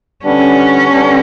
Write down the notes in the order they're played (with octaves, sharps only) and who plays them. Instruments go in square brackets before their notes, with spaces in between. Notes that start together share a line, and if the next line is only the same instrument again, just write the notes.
[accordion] D3 G3 B3 D4 [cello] C#4
[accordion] D3 G3 B3 D4